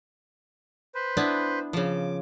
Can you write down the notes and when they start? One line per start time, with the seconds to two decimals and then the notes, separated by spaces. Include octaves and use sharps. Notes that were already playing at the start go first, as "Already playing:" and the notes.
0.95 B4 C5
1.17 B3 D4 E4
1.73 C#3 F3 D6